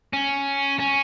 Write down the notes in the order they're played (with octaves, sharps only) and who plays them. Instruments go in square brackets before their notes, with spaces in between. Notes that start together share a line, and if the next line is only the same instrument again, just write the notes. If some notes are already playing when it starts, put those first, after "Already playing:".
[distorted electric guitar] C#4
C#4